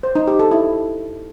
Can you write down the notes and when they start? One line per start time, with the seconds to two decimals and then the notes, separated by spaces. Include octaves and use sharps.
0.03 C5
0.15 D#4
0.27 G4
0.39 A4
0.51 E4